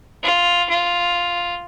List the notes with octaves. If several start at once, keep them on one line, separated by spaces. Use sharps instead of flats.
F4
F4